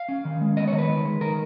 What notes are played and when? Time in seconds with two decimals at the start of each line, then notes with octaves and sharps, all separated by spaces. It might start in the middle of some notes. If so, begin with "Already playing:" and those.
Already playing: F5
0.08 C#4
0.25 D#3
0.41 G#3
0.57 B3 D#5
0.68 C#5
0.73 D#3
0.78 B4
0.89 D#3
1.05 G#3
1.21 D#3 A#4